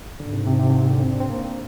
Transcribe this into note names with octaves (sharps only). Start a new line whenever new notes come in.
G#2 D3
C3
C3
C3
C3
A#2
D3
C4
D4
C4
A#3